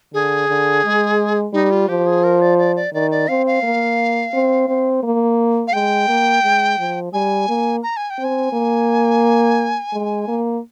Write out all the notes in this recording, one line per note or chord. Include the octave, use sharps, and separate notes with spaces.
D3 G#4
D3
G#3
G3 D#4
F4
F3 G4
G#4
A#4
D5
D5
D5
D#3 D5
D5
C4 F5
F5
A#3
C4
C4
A#3
F5
G#3 G5
A#3
G#3
F3
G3 G#5
A#3
A#5
G#5
G5
C4
G#5
A#3
G#3
A#3